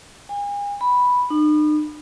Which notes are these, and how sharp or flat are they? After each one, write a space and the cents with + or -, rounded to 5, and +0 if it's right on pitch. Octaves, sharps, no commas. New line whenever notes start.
G#5 -40
B5 -5
D#4 -45